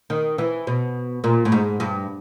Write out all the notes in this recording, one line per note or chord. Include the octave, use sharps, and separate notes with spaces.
D#3
E3
B2
A#2
A2
G#2
G2